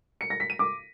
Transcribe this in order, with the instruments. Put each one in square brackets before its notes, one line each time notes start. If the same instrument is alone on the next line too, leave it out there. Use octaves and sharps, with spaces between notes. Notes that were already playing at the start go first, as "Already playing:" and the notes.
[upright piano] C#7
A#6
B6
D#7
D6